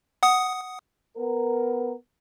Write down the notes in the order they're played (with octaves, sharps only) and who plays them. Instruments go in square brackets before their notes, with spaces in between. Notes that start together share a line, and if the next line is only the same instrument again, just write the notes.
[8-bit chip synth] F#5 D#6
[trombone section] B3 A#4